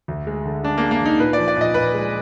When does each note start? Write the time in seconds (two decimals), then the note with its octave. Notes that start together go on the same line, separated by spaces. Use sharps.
0.08 D2
0.27 G#3
0.45 D3
0.64 G#3 D4
0.78 A#3
0.83 G#3
0.91 A#3
1.01 D2 D#4
1.19 A#2 B4
1.33 F3 D5
1.48 D5
1.57 A#2 D#5
1.74 A#2 B4
1.94 G#3